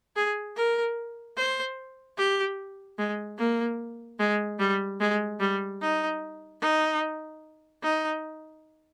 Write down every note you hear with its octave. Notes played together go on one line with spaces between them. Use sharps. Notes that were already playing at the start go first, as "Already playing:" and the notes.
G#4
A#4
C5
G4
G#3
A#3
G#3
G3
G#3
G3
D#4
D#4
D#4